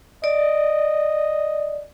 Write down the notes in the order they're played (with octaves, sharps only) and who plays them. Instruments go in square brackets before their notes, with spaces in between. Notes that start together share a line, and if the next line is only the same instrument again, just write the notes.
[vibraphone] D5 [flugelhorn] D#5